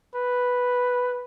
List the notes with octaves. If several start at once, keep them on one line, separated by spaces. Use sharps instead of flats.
B4